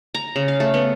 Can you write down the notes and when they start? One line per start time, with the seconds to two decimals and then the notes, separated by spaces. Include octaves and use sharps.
0.15 A#5
0.36 C#3
0.48 F5
0.60 A3
0.74 B3